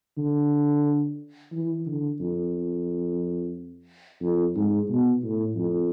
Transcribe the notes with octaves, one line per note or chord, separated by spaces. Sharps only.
D3
E3
D3
F2
F2
G#2
B2
A2
F2